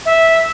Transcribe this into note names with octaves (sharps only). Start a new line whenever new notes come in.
E5